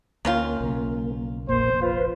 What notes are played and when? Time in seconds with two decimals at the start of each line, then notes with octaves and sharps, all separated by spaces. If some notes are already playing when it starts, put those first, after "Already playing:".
0.25 D2 D#3 A#3 C#4 F4
0.61 B1 C#3
1.49 F1 A#1 A#2 A#3 C5
1.82 F4 B4 C5